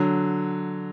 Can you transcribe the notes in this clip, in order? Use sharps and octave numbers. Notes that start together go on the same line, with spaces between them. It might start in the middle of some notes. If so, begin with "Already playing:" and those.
Already playing: D3 F#3